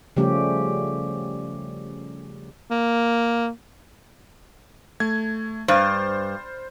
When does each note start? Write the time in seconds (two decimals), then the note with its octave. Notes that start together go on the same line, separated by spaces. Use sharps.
0.16 C#3 F3 G3 A3 C#4 G4
2.71 A#3
5.00 A3 G#6
5.68 G2 C5 F6 A6